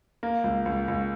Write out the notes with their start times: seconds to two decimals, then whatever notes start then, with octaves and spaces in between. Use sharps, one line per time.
0.23 A#3
0.44 C#2
0.66 C#2
0.88 C#2